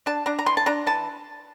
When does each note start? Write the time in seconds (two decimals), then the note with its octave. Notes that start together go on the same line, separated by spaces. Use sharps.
0.06 D4 A5
0.26 D4 A#5
0.39 A#5
0.46 E3 C6
0.57 A5
0.66 D4 A#5
0.87 E3 A5